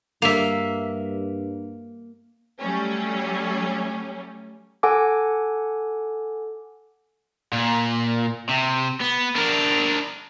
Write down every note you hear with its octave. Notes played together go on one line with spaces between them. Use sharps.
G2 A#3 E5
F#3 G3 A3 C#4
A4 F#5 G#5 D6
A#2
C3
B3
D4 A#4